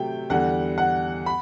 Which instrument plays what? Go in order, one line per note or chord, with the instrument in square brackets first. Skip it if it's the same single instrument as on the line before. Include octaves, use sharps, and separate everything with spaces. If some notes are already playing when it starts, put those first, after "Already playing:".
Already playing: [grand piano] C3 F#3 A3 G5
E2 D3 G3 F#5
F#5
B5